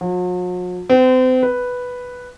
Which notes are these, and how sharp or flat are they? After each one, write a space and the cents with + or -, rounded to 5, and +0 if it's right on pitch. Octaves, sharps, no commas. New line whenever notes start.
F#3 -45
C4 -35
B4 +0